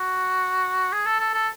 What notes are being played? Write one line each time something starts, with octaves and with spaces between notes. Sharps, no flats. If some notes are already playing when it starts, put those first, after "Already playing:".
Already playing: F#4
G#4
A4
A4
A4